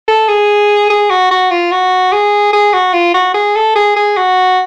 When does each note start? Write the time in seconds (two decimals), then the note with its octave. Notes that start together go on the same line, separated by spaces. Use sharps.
0.08 A4
0.28 G#4
0.90 G#4
1.10 F#4
1.31 F#4
1.51 F4
1.72 F#4
2.12 G#4
2.53 G#4
2.73 F#4
2.93 F4
3.14 F#4
3.34 G#4
3.55 A4
3.76 G#4
3.96 G#4
4.17 F#4